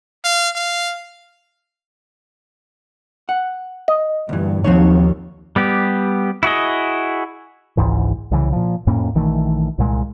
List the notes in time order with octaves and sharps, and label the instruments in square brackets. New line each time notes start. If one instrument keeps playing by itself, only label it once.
[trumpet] F5
F5
[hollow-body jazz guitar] F#5
[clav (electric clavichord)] D#5
[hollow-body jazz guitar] D2 E3 [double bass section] G2
[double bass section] D#2 [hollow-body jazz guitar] D#3 F#3 C4 [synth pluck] F3 C#5
[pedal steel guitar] G3 B3 G4
E4 F#4 G#4 D#5
[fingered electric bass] G#1 C#2 G#2 E3
C2 C#3 E3
A#2 F3
F2 A2 A#3 C#4
A#1 D#3 E3 A3
C2 A#2 G#3